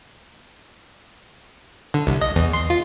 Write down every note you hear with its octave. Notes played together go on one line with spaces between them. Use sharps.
D3
C2
D#5
E2
C6
F4